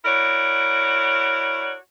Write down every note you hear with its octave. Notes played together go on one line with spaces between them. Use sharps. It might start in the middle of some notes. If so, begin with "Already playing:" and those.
E4 F#4 A#4 C#5 D5